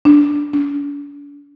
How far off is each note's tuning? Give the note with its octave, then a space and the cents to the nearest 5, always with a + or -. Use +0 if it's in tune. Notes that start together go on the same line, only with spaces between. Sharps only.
D4 -5
D4 -40